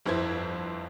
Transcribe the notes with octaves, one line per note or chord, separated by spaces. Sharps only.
G1 F2 E4 C5 G#6